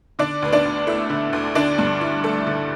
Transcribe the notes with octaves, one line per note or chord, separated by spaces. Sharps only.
D3 D4 D5
D2 B4
D4 D5
D2
A3 E4 E5
D3
D2
D3 D4 D5
G2
E4
A3 A4
D3